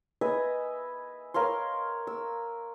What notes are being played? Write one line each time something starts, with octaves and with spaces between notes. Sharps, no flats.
B4 D#5 E5 G#5
A#4 C#5 F5 C6
E6